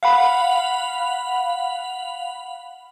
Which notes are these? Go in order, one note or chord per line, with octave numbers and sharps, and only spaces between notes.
F5 F#5 B5